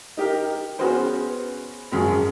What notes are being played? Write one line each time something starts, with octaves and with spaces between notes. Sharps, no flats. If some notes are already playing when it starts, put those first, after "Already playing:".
D#4 G4 A#4
B3 C#4 F#4 G#4 B4 C5
G#1 F#2 G#4